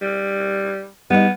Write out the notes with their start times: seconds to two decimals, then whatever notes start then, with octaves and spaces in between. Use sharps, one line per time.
0.01 G3
1.10 G3 B3 D#4